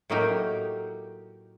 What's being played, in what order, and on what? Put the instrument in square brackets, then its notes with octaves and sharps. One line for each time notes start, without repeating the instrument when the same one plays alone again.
[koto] A2 F#3 A#3 D#4 G4